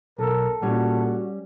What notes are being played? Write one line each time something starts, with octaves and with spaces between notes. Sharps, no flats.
B1 A4 A#4
A#2 G3 C#4 F#4